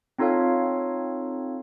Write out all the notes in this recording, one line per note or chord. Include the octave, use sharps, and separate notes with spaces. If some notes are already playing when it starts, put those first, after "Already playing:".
C4 D#4 F4 A4 C#5 F5